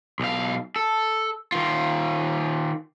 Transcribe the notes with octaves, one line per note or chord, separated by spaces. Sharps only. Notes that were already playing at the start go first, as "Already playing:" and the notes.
B1 F5
A4
D#3 F4